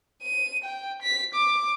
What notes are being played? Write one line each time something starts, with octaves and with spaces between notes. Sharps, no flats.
D#7
G5
B6
D6